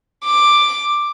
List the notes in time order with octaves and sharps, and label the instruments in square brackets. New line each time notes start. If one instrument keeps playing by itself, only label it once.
[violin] D6